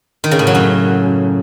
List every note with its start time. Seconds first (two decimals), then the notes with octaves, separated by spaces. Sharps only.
0.24 D#3
0.31 C#3
0.39 A2
0.47 F#3
0.55 F#2